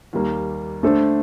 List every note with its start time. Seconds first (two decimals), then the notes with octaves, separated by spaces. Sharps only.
0.13 D#2 D#3 G3 A#3
0.83 D3 A3 D4 A4 C5